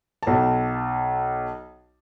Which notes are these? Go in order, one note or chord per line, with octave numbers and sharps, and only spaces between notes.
B1 A5